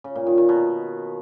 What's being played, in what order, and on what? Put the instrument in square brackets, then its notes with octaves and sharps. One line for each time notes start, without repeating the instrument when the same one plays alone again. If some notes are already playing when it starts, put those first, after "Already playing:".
[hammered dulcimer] C#3
A#2
D#3
D#3
B2